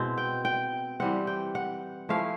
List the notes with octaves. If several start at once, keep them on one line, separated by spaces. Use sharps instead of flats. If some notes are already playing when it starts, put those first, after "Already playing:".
Already playing: B2 G#3 C4 E4
G5
G5
E3 G3 C4 F#5
G5
F#5
F3 A3 C#4 E4 F5